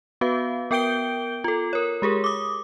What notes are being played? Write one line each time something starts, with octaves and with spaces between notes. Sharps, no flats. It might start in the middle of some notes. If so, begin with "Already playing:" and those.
B3 F#4 B4 F5
B3 A#4 G5 G6 D7 G7
F4 A4
A#4 C#5
G#3 G4 G#4 A#4
D6 D#6